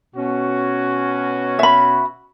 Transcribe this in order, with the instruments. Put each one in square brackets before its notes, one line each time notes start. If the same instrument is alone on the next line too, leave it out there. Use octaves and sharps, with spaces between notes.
[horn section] B2 C#4 F#4
[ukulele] E5 B5